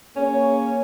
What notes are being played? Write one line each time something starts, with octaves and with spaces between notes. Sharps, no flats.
A#3 C#4 G#4 C#5